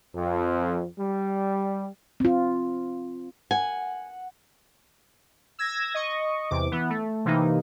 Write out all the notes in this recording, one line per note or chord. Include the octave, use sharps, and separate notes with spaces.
F2
G3
C4 F4
F#5 G#5
E6 G#6 A#6
D#5 C#6
E2 C3 D6
E3 B3
A3
C3 E3 A#3 D#4